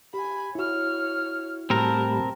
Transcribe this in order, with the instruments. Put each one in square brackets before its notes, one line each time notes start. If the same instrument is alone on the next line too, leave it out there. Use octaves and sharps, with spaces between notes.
[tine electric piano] G4 [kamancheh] G#5 B5
[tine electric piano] E4 F#4 [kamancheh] C#5 F6
[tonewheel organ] A2 G3 [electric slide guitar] C4 A#4 [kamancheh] A5 B5